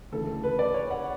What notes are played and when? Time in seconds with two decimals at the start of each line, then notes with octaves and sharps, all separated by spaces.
0.12 D2 C#3 E3 A4
0.44 B4
0.59 D5
0.74 C#5
0.91 F#5